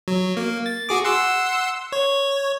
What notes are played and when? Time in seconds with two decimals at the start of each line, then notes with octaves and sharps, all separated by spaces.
0.08 F#3
0.37 A#3
0.66 A6
0.89 F#4 G#4 D6
1.05 F#5 C6 E6
1.92 C#5